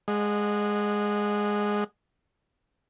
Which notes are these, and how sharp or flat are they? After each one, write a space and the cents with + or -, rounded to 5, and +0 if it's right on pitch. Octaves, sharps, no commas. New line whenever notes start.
G#3 +0 D#5 -20 F#5 -20